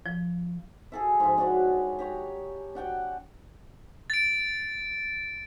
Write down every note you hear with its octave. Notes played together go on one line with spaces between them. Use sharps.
F3
G#4 A4 E5
G#2 F3
D4 F#4 C#5
G4 C#5 A#5
D4 F#5 G5
A6 D7